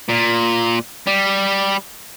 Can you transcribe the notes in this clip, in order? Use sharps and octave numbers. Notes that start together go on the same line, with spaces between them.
A#2
G3